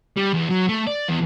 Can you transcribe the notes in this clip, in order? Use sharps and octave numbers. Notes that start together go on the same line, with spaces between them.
G3
E2
F#3
A3
D5
E2